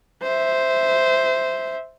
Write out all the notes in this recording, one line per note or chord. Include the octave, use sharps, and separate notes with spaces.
C5 E5